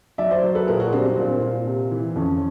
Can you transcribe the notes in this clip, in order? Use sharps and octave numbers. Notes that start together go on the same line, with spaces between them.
F#3 D5 E5
C5 D5
F#3
A4 B4
A#2 G#4 A#4
F#4 G#4
G3 C4 D4
C4
A#2
A#2
C3
E3
F2 C#4